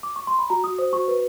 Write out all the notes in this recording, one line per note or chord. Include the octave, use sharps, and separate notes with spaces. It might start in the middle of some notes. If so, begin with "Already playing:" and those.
D6
C#6
C6
B5
F#4 A#5
F#4 D#6
C5 D#6
F#4 C#6
B4